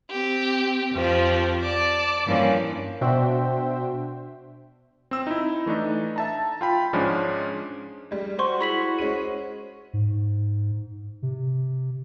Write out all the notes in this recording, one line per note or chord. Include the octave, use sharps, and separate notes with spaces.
C4 G4
F2 F3 G4 C5
D5 A5 D6
G2 E3 F3 G3 A#3 C#4
B2 D4 F#4 C5 E5 G5
C4 E6
D#4 E4
E3 A3 D4 D#4
E5 A5 A#5
F4 G5 B5
G#2 F3 G#3 C#4 D4
G3 G#3
F#4 C5 C6 C#6
E4 G#4 B5 B6 F#7
G#3 C#4 C5 D#7
G#2
C3